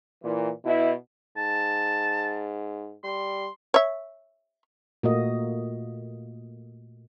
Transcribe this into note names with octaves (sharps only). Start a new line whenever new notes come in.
A#2 E3
B2 E4
G#2 A5
G3 C6
C#5 E5
A#2 A3 A#3 F#4 A#4 D#5